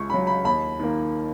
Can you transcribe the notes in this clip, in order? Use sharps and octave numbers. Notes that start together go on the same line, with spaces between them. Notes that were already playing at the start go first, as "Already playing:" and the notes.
Already playing: C#2 C#6
C#3 F#3 B5
B5
D#2 B5
D#3 A#3